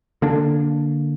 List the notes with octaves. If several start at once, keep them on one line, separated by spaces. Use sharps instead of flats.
D3 A#3 D4